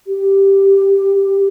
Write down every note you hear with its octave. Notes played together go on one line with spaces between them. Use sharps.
G4